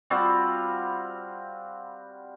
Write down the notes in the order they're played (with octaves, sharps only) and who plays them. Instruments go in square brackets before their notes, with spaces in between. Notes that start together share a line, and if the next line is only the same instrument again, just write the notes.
[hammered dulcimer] G3 C4 F4 F#4